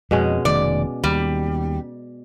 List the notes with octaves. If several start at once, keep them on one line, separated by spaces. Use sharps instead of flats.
F2 B2 G#3 C#4
F1 D#3 A3 D5
D#2 G3